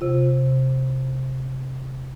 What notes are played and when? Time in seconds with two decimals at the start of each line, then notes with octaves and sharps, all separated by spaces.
0.01 C3 F4